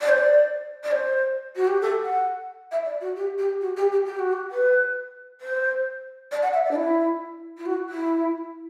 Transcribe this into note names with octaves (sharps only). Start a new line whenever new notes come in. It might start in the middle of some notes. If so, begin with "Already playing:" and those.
D5
C5
D5
D5
C5
F#4
G4
A4
F#5
E5
D5
F#4
G4
G4
F#4
G4
G4
G4
F#4
G4
B4
C5
D5
F#5
E5
D5
D4
E4
E4
F#4
E4